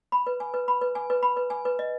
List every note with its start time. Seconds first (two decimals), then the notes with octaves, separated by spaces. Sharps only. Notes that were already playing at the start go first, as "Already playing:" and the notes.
0.12 B5
0.27 B4
0.40 G#5
0.54 B4
0.68 B5
0.81 B4
0.95 G#5
1.10 B4
1.23 B5
1.37 B4
1.50 G#5
1.65 B4
1.79 D#5